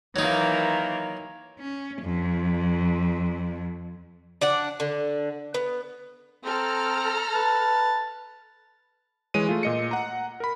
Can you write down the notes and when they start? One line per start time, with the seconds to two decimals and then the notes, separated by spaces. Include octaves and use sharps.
0.16 D#3 E3 F#3 A#3 D#4
1.60 C#4
2.02 F2
4.41 D4 D5 F#5
4.80 D3
5.54 B3
6.45 C4 A4 A#5 F6
7.34 B4 A5
9.34 E3 G#3 C#5 D#7
9.47 A3 F4 G#4
9.63 A#2 D#5 C#7
9.91 F#5 A#5
10.40 A#4 B5